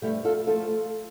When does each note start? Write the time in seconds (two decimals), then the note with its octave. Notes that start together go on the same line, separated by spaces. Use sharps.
0.02 G2 F3 A3 E4 G4
0.25 F4 A4
0.47 F3 A3 F4 A4